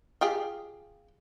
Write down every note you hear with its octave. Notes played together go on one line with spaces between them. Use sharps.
F4 G4 G#4